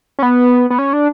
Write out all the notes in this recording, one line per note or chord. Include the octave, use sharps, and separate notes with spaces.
C#4
B3
B3
C#4
D4